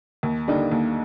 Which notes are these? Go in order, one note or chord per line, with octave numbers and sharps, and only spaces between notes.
D#2
D3 G3 A#3 D#4
D#2